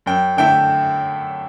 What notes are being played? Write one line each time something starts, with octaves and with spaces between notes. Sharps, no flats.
F#2 G5
D3 A3 E4 G5